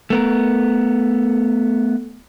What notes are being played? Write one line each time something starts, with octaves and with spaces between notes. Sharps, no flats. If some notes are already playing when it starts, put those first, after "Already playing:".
A3 B3 A#4